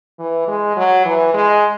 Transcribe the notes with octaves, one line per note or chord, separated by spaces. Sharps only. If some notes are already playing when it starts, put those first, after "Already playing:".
E3
G#3
F#3
E3
G#3